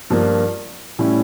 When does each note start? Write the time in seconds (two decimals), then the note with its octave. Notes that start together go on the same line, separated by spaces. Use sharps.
0.10 G2 F3 A#3
0.99 A2 G3 C#4 E4